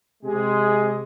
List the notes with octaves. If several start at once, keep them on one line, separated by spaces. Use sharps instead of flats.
C3 G#3 G4 G#4